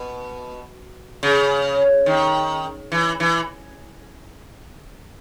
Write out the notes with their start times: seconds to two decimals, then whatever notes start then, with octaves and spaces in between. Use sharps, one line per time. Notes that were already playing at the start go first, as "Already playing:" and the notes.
Already playing: B2
1.23 C#3
2.06 D#3
2.92 E3
3.20 E3